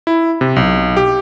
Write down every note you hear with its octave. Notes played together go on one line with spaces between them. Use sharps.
E4
C3
B1
G4